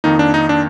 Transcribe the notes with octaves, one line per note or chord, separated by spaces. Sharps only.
F2 D#3 A#3 D#4
D4
D#4
D4